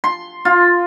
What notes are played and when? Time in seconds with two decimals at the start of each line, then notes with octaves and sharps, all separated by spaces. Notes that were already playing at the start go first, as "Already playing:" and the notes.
0.04 C6
0.45 F4